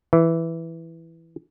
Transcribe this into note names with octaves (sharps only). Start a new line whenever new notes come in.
E3